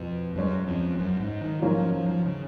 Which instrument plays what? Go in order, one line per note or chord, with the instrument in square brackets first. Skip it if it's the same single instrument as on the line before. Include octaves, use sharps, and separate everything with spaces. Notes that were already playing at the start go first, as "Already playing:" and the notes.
Already playing: [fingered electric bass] F2 [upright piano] B2
[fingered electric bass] F#2 [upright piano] C#3 G#3 C#4
[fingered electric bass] F2
F#2
G#2
D#3
[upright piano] G#2 F#3 A#3 C#4 F4 [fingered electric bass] F3
[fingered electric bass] F3
F3
F3
C#3